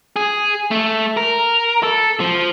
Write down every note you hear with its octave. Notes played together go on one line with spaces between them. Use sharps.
G#4
A3
A#4
A4
F3